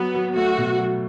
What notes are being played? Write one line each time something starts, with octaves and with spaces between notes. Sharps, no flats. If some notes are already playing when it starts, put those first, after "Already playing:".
Already playing: F#3 B3
F#3
A3 F#4
B2
F#3